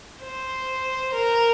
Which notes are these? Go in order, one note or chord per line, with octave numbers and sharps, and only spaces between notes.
C5
A#4